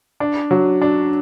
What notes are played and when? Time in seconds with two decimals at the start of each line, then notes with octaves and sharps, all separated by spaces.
0.20 D4
0.51 F#3
0.82 D4